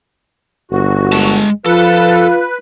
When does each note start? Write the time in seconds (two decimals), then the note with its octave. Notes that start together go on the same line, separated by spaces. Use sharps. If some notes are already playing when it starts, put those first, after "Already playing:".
0.71 G1 F#4
1.13 G#3 A5
1.66 F3 F4 A4 B4